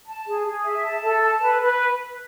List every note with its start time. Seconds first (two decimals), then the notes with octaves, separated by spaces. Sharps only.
0.07 A5
0.26 G#4
0.46 G#4
0.65 E5
0.85 A5
1.04 A4
1.22 A5
1.41 B4
1.61 B4